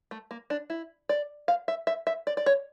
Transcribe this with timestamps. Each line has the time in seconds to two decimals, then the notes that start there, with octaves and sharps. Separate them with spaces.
0.11 A3
0.31 A#3
0.50 D4
0.70 E4
1.09 D5
1.48 F5
1.68 E5
1.87 E5
2.07 E5
2.27 D5
2.37 D5
2.46 C#5